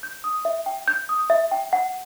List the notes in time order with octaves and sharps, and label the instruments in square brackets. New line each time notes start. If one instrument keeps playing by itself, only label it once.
[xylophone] G6
D#6
E5
G5
G6
D#6
E5
G5
F#5